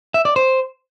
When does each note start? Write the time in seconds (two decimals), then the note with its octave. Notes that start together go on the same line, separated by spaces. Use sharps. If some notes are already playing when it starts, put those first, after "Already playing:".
0.14 E5
0.25 D5
0.36 C5